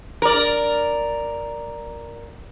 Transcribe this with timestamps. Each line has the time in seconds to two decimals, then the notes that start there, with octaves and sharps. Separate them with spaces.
0.22 A#4 D5